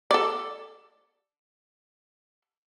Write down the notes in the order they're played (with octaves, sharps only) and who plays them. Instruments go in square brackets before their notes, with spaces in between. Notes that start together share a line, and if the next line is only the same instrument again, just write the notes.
[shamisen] A4 D5